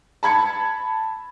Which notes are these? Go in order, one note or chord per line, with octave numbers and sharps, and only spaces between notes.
A5 B5 G#6 C#7